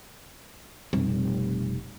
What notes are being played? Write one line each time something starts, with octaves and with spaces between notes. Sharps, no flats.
F1 B2 G3 C4